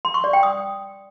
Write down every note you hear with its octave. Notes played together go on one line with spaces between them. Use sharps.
C6
C#6
D5
G5
D#6